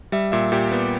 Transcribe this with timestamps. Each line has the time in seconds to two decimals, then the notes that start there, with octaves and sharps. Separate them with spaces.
0.12 G3 E5
0.32 A#2 E5
0.52 A#2 G4
0.72 B3